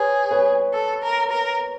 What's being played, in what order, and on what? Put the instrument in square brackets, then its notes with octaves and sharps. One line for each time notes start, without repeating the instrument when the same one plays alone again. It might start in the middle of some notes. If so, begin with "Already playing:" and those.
Already playing: [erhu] G#4 [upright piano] B4 C#5
[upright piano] B4 C#5
[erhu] A4
A#4
A#4